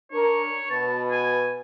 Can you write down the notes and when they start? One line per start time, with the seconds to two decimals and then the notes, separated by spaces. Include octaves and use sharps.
0.12 D4 A#4 C#5
0.70 B2 B4 A5
1.11 G#5